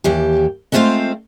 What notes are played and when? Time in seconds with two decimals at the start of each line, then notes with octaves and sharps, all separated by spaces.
0.04 D#2 E3 G4
0.72 G#3 A3 C4 F4 C5 F5